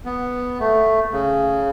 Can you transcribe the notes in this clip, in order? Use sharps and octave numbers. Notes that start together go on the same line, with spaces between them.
B3
A3
C#3